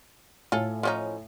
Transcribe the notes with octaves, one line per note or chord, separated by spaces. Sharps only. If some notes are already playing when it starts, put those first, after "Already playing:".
A2 F4 A4 G#5
F3 C#4 D#4